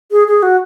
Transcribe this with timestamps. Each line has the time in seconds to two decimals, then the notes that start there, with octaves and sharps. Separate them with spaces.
0.11 G#4
0.28 G#4
0.43 F#4